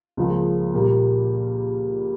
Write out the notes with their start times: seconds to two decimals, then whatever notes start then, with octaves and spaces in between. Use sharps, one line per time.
0.17 C#2 C#3 F3 A#3
0.74 A#2 G3 A#3